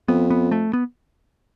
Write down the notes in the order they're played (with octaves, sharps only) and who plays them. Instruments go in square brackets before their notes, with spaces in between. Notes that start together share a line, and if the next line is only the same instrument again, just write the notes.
[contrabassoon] F2 [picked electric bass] B3
[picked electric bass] B3
A3
B3